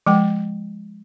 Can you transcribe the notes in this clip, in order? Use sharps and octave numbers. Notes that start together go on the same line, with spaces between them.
F3 G#3 G5